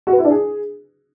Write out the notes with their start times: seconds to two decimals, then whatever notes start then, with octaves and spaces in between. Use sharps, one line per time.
0.07 F#4
0.13 B4
0.19 E4
0.25 D4
0.30 G#4